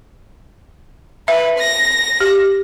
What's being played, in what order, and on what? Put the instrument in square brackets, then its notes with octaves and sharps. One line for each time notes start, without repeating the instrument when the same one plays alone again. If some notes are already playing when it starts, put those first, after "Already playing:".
[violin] B4 [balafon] E5
[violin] A#6
[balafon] G4